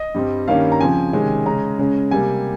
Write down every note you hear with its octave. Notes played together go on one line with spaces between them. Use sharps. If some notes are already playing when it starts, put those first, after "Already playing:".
Already playing: D#5
G2 G3 C4
G2 D#3 G3 A#3 C#4 F5
A#5
C#3 F3 C4 G#5
C3 D#3 G#3 C#4
C#3 G#3 C#4 A#5
C#3 G#3 C#4
C3 G3 A#3 G#5